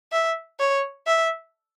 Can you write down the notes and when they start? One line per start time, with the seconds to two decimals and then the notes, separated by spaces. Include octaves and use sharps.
0.12 E5
0.59 C#5
1.07 E5